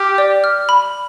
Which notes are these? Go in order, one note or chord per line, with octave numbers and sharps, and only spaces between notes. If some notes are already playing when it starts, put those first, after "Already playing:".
Already playing: G4 F6
D5
F6
B5